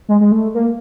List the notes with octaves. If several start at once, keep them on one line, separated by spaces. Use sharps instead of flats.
G#3
G#3
A3
A#3